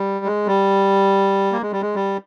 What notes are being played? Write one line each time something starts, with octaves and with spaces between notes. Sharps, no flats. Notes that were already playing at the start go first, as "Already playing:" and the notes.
Already playing: G3
G#3
G3
A#3
G#3
G3
G#3
G3